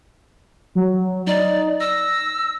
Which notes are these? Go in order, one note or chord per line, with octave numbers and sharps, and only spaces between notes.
F#3
D#4 D5
E6 A#6